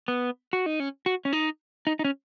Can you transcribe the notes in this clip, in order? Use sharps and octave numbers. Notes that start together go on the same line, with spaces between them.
B3
F#4
D#4
C#4
F#4
C#4
D#4
D#4
D#4
C#4